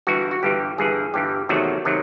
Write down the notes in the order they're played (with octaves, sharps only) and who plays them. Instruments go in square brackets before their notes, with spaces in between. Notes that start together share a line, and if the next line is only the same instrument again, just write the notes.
[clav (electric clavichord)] G1 G2 E3 F#4
F#4
G1 G2 E3 G4
G1 G2 E3 G#4
G1 G2 E3 G4
E2 C3 D#3 F#3 A3 F#4
C3 D#3 F#3 A3